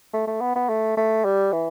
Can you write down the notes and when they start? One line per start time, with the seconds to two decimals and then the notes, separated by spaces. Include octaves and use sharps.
0.13 A3
0.28 A3
0.41 B3
0.56 B3
0.69 A3
0.97 A3
1.25 G3
1.53 E3